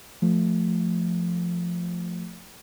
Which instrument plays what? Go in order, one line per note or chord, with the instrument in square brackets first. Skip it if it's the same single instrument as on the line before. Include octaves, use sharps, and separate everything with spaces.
[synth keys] F3 A3